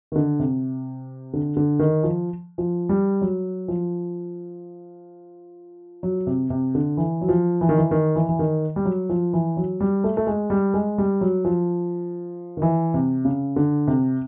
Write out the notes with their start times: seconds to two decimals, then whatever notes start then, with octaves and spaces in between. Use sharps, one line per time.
0.12 D#3
0.16 D3
0.39 C3
1.33 D3
1.57 D3
1.79 D#3
2.03 F3
2.58 F3
2.89 G3
3.22 F#3
3.68 F3
6.03 F#3
6.27 C3
6.50 C3
6.75 D3
6.97 E3
7.21 F#3
7.29 F3
7.61 E3
7.69 D#3
7.78 E3
7.91 D#3
8.16 E3
8.29 E3
8.39 D#3
8.76 G3
8.85 F#3
9.09 F3
9.33 E3
9.57 F#3
9.80 G3
10.04 A3
10.17 A3
10.27 G#3
10.50 G3
10.74 G#3
10.98 G3
11.21 F#3
11.45 F3
12.57 D#3
12.62 E3
12.94 C3
13.25 C#3
13.56 D3
13.87 C3